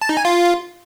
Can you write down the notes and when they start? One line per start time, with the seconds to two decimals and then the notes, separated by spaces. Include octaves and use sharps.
0.02 A5
0.09 D#4
0.17 G#5
0.25 F4